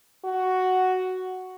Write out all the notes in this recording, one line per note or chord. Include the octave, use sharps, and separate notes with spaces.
F#4